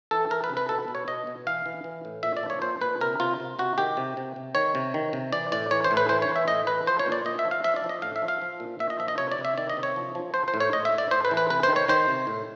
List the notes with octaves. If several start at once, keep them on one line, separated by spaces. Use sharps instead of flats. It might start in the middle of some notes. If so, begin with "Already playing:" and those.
E3 A4
E3 A#4
B4
C3
B4
B2 A4
B2
C#5
B2 D#5
B2
E3 F5
E3
E3
A2
A#2 E5
D5
F3
C#5
A#2 C5
A#2 B4
C3 A#4
C3 F4
C3
C3 F#4
D#3 G4
C3
C3
C3
D#3 C#5
C3
D#3
C3
E3 D5
A2 D5
E3 C#5
C5
A2
B4
E3 C5
C#5
E3
E5
A2 D#5
E3 B4
F3 C5
C#5
A#2
D5
A#2 D#5
E5
F3
F5
F3 E5
D5
F3
D#5
A2 F5
E5
F3
F5
F3
A#2
A#2 E5
D#5
F3 E5
D#5
C3 C#5
D5
C3
E5
D#3 D5
D#5
C3
C#5
F3
F3
F3 C5
C5
A2
C#5
A2 D#5
E5
A2
D5
A2 C5
B4
E3
B4
C3 B4
C5
D#3
C#5
D#3 C5
C3
A2